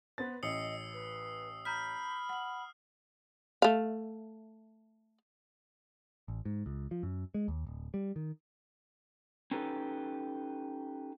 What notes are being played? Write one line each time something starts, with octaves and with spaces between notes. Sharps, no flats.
B3 B4 C5 A6
A1 D#5 D#6 E6 C7 C#7
B4
A#5 B5 F6 G6 B6
F#5 F#7
A3 F5
A1
G#2
C#2
F3
F#2
G#3
D#2
D1
G3
D#3
C#4 D#4 G4 A4 B4